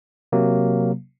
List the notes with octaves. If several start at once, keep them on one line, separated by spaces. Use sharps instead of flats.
C3 F#3 A#3